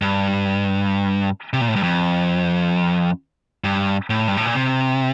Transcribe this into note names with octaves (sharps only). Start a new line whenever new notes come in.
G2
C3
A#2
A2
G2
F2
G2
A2
G2
A2
A#2
C3